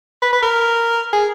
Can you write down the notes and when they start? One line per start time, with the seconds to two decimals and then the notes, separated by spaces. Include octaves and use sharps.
0.22 B4
0.33 B4
0.42 A#4
1.13 G#4